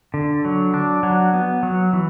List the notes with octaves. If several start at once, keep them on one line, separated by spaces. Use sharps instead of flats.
D3
F#3
D4
F#3
B3
F#3
E3